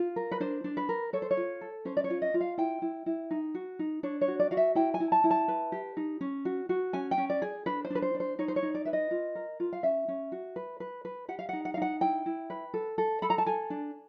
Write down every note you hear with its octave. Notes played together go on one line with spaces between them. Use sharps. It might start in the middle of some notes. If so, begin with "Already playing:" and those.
Already playing: F4
A#4
B4
D4 C5
D4
B4
A#4
A4 C#5
C5
C#5
F4
A4
C#4 C5
D5
C#5
F4
D#5
F4
F5
E4 G5
E4
E4
D#4
F#4
D#4
D4 C#5
C#5
F#4
D5
F#4 F5
E5
E4 G5
G#5
E4
A5
E4
A5
B4
G4
D#4
C#4
F#4
F#4
C#4 G#5
G5
C#4
D5
G#4
D4 B4
C5
D4 B4
C5
D4
C5
D#4 C#5
C5
C#5
D#4
D5
B4 E5
D#5
F4
A#4
F4
F5
C#4 E5
C#4
F#4
B4
B4
B4
G4 F#5
F5
D#4 F#5
F#5
F5
D#4 F#5
E4 G5
E4
B4
A4
A4
A4 B5
A#5
A5
A4 G#5
D4